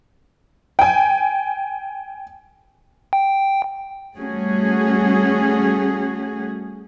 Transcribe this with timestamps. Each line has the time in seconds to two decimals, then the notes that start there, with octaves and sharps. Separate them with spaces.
0.79 G5 G#5
3.13 G5
4.16 G3 A3 C#4 F#4 G#4